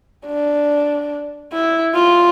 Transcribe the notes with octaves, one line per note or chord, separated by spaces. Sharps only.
D4
E4
F4